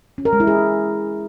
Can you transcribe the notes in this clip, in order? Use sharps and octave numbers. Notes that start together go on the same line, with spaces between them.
C#4
A#4
G#3
E4
G#4